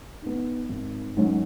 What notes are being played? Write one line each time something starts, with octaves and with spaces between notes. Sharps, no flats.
B3 D#4
G#1
G#2 D#3 F#3 C#4